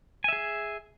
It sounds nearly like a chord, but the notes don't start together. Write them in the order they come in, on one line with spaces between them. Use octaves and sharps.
G#5 E5 G#4